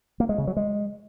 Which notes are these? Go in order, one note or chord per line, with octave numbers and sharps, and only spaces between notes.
A#3
G#3
C#3
F#3
G#3